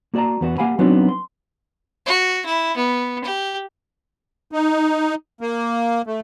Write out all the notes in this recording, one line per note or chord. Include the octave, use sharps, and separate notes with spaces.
A#3 F#4 D5 A5 A#5
E2 B3 F#4
A#3 G4 F5 F#5 G#5 B5
F#3 B3 C4 D4 D#4 F#4
C6
F#4
E4
B3
G4
D#4
A#3
A3